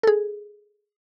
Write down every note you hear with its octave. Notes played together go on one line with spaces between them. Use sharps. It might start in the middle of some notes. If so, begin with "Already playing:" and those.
G#4 A4